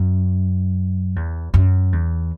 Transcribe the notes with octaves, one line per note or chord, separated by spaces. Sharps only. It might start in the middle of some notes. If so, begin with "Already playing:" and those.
Already playing: F#2
E2
F#2
E2